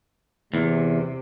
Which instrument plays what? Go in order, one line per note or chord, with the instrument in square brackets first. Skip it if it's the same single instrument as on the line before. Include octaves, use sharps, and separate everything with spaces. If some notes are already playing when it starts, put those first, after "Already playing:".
[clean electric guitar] E2 [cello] C3